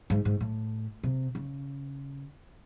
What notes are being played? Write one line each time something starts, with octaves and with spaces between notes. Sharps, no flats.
G#2
G#2
A2
C3
C#3